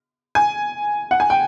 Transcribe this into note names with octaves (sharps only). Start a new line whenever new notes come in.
G#5
F#5
G#5
G5